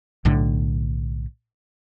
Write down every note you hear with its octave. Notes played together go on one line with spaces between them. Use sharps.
B1 A2 D3